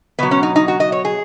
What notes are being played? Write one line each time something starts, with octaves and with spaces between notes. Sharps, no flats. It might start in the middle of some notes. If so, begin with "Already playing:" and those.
B2 F#3 B3
C#4
D#4
D#4
F#4
D#5
C#5
G#4